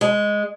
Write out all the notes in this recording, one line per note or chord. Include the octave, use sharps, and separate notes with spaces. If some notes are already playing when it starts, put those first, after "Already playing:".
G#3